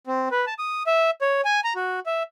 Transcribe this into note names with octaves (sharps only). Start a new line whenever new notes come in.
C4
B4
A5
D#6
E5
C#5
G#5
A#5
F#4
E5